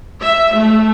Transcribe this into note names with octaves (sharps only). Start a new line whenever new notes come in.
E5
A3